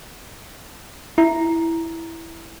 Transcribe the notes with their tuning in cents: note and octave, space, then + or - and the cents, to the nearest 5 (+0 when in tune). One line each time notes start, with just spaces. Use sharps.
E4 +0 A#5 +0